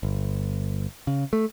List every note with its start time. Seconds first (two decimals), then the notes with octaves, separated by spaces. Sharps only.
0.03 G1
1.07 C#3
1.33 A3